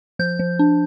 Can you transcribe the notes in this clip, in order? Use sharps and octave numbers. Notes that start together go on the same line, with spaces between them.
F3 G6
F3
D4